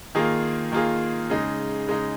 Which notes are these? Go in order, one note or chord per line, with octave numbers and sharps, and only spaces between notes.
D#3 A#3 F4 G#4
D#3 A#3 F4 G#4
C#3 G#3 D#4
C#3 G#3 D#4